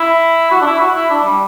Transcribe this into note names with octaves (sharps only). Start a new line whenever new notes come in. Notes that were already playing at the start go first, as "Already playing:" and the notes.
Already playing: E4
F#4
D4
E4
F#4
E4
D4
G3